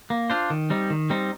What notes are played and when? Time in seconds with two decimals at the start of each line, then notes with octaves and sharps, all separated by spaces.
0.10 A#3
0.30 D4 F4 C5
0.50 D#3
0.70 G3 C4 D#4
0.90 D#3
1.10 G3 C4 D#4